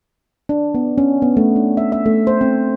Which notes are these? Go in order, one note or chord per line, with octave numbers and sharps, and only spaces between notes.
D4
B3
C#4
B3
A3
D4
E5
E5
A3
C5
C4